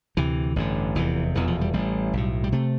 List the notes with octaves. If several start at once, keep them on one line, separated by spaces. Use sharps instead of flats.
D2 C3 E3
A1 G2 D3
F1 E2 C3 E3
F1 E2 B2 E3
F3
G3
A1 A2 G3
B1 A2
G3
C3 A3